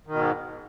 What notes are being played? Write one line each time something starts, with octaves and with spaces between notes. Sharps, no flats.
G#2 B2 D#3